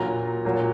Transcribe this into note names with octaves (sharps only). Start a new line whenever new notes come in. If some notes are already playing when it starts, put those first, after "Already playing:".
Already playing: A#2 F#3 A#5
A#2 F#3